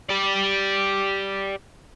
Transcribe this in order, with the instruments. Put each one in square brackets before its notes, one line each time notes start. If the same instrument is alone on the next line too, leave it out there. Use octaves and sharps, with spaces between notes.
[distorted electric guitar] G4 D5